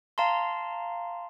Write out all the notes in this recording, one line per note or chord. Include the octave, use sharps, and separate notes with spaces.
F5 A5 A#5 C6